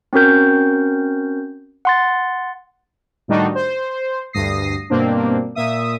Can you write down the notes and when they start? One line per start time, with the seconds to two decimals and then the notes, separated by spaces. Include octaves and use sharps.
0.13 C4 C#4 F#4 A#4 G6
1.85 F#5 C6 A6
3.28 A2 D#3 G3 D4 D#4 F#4
3.55 C5
4.33 D2 G2 D#6 A#6 C7
4.90 G2 B2 A#3 C4 D4
5.55 A#2 E5 D#6